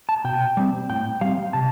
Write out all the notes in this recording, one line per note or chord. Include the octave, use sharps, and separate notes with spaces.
A5
B2 G5
G3 C4
A2 G5
G3 C4 F5
C3 A5